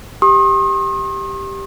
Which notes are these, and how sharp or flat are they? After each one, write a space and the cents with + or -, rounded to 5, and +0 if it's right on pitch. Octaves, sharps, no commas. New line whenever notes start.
G4 +0 C6 +45 D#6 +0